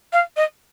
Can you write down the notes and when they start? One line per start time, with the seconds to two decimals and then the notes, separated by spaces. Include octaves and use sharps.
0.13 F5
0.37 D#5